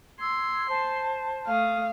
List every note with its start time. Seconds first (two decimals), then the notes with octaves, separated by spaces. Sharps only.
0.19 C6 E6 G#6
0.68 C5 A5
1.47 A3 F5 D#6